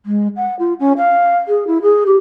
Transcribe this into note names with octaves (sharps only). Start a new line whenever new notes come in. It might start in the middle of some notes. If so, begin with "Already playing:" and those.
G#3
F#5
F4
C#4
F5
G#4
E4
G#4
G4